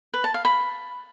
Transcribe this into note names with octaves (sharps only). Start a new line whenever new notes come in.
B4
A5
F5
B5